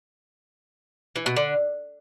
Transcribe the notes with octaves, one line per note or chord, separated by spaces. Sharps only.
E3
B2
D3